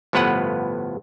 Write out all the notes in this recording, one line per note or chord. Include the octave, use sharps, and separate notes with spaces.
G1 A2 F3 B3 B4 F#5